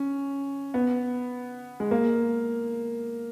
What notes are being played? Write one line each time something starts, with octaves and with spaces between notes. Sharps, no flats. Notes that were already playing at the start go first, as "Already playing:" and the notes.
Already playing: C#4
B3
G#3
A#3